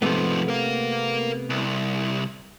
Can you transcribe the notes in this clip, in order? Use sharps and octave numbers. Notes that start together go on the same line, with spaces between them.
G#2 C3 F3 A3 B3
A#4 F5
C2